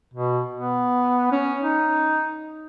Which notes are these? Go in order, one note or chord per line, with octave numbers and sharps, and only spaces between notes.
B2
B3
C#4
D#4